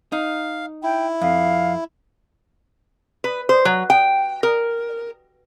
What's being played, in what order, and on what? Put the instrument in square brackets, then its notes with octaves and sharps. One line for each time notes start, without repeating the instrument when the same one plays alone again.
[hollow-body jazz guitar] D#4 [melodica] F5
[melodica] E4 [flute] G5
[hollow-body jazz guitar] F2 [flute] F5
[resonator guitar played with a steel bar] B4
C5
F#3
G5
A#4